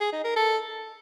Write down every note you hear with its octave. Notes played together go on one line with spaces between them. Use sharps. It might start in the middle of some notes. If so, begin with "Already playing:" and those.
G#4
D#4
A#4
A4